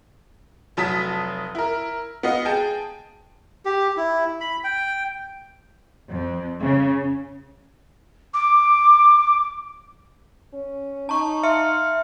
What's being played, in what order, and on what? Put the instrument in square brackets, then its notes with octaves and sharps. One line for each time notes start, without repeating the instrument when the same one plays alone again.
[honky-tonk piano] F1 F#3 A5 D#6 B6
E4 A#4
B3 F#4 D#5 F5
G#4 G5 A5
[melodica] G4
E4
B5
G5
[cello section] F2
C#3
[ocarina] D6
[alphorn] C#4
[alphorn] D#4 [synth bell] A5 A#5 C#6
[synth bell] E5 C6 C#7 [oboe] F5